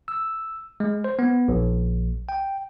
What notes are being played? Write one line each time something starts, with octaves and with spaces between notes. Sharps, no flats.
E6
G#3
C5
B3
A#1
G5